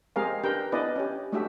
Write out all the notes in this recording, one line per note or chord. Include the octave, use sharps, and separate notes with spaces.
G#3 C4 G4 G#4 A#4 F5
D4 G4 A#4 B4 G5
B3 D4 E4 B4 D5 D#5
C#4 G4
G#3 A3 D4 F#4 G4 E5